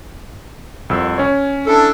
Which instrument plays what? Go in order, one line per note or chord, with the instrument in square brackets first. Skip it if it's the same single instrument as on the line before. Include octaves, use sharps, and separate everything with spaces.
[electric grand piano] C2 F2 E6
C#4 C#5
[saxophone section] D4 E4 A4